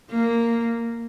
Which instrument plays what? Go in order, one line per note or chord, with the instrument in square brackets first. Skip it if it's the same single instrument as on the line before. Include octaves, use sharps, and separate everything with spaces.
[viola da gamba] A#3